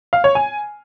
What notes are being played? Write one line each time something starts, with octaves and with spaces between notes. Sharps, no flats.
F5
C#5
G#5